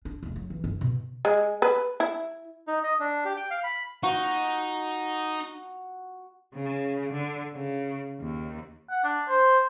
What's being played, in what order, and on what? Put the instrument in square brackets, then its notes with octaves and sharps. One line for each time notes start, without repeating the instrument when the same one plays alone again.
[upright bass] D4
F1 A3
F#3
E3
G2 C#4
B2
[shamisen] G#3
B4
E4
[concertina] D#4
D#5
D4
G4
G5
F5
B5
[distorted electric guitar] D#4 [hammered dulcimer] F#4
[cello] C#3
D3
C#3
D#2
[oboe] F#5
D4
C5